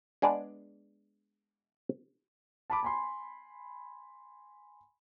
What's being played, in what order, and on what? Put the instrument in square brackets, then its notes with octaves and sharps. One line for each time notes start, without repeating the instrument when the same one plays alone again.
[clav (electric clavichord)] G#3 B3 D4 G#4 D5
[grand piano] A5 B5 D6
G#5 B5 C6